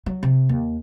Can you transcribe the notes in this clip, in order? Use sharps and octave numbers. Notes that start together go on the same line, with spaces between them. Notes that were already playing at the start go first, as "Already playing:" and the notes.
F#3
C3
D#2